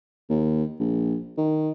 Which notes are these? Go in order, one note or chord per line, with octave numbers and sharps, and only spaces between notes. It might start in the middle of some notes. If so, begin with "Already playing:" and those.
D#2
A#1
D#3